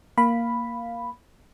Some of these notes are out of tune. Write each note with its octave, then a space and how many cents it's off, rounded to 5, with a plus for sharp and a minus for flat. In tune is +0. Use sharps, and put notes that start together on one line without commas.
A#3 +0 F5 +0 B5 +0